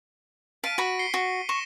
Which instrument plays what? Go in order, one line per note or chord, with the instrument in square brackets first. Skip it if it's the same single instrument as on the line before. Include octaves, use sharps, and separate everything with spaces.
[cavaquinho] F5 A5 [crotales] B6 D7 D#7
[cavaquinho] F#4 B5
[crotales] C7 C#7 G7
[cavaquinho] F#4
[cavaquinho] C#6 [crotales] A#6 E7